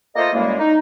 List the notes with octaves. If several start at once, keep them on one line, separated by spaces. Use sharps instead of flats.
A3 A#3 F4 A4 C5 D#5
F#2 E3 G3 G#3 A#3
D#4